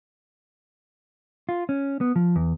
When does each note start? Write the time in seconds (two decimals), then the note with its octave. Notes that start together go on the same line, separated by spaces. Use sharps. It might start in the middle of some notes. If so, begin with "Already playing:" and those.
1.49 F4
1.69 C#4
2.01 B3
2.16 F3
2.36 E2